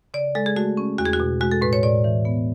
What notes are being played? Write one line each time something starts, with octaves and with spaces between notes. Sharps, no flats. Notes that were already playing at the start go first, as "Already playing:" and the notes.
C#3 D5
G#3 A4
G#4
A3 F#4
C#4
E2 F#4
G#4
F#4
B2
G#3 F#4
A4
A2 B4
C#5
A2 D5
E3
B3